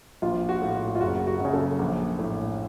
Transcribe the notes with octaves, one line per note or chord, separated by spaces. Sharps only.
A#1 F4
F#4
A2
F#4
F4
F#1 F#4
F#4
F#2 C#3
A4
A#1
A2